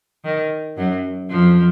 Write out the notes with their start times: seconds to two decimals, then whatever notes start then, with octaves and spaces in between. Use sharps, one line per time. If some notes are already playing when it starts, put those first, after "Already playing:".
0.25 D#3
0.77 F#2 F#3
1.30 F2 F3